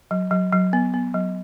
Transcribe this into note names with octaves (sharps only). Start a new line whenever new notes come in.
F#3
F#3
F#3
B3
B3
F#3